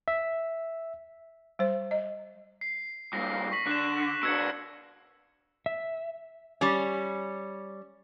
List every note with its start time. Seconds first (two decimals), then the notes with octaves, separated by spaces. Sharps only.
0.08 E5
1.59 G3 C5
1.91 D#5
2.61 C7
3.13 G2 A#2 A#6
3.52 C#6 B6 F#7
3.67 D3 F#6 E7
4.23 B2 D4 E6 G#6 C#7
5.66 E5
6.61 G3 C#4